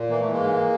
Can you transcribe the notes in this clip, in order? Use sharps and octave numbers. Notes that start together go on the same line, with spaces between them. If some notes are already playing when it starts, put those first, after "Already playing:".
Already playing: A#2
E3 A#3
E3 A3
G#3 A#3
G#2